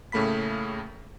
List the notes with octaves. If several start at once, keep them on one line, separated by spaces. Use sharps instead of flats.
A2 C#3 A3 A#3 B5 B6